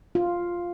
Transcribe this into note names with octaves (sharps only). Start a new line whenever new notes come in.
F4